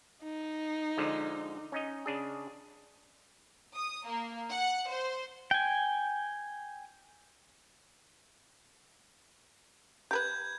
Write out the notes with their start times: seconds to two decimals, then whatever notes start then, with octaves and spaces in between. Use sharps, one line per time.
0.23 D#4
0.97 D3 F3 G#3
1.72 C#4 D#4 D#5
2.06 C#3 D4 G#4
3.76 D#6
4.08 A#3
4.50 F#5
4.90 C5
5.51 G5 G#5
10.11 G4 A#4 B4 G6 G#6